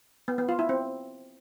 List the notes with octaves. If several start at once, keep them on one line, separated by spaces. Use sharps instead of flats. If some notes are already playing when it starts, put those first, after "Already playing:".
B3
B3
F4
E4
C4